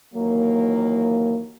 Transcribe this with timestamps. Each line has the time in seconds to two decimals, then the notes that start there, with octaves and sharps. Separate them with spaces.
0.14 D#2 E3 F#3 A#3